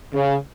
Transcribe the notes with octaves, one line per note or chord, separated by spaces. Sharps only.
C#3